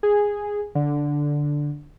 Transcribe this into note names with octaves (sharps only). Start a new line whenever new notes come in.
G#4
D3